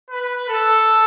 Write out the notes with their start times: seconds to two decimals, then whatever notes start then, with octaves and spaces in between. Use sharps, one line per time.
0.11 B4
0.49 A4